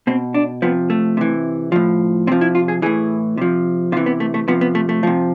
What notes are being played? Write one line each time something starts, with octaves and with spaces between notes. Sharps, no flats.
B2 C4
D4
C3 F3 B3
A3
C3 E3
A2 F3
C3 F3 C4
E4
F4
G#4
A2 E3 G#4
C3 F3
C3 E3 F4
B3
A3
A3
C3 F3 B3
B3
A3
A3
C3 F3